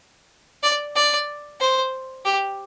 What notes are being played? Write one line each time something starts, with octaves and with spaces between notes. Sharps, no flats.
D5
D5
C5
G4